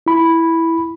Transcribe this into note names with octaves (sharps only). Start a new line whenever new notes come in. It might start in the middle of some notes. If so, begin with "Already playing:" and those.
E4 B5